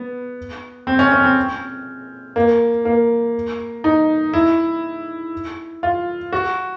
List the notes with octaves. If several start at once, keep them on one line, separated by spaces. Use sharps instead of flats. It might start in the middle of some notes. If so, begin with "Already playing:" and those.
Already playing: B3
C4
C#4
C#4
C4
A#3
A#3
D#4
E4
F4
F#4